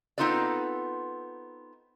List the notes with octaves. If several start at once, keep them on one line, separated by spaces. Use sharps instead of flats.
B3 C4 D#4 F4 A4 D5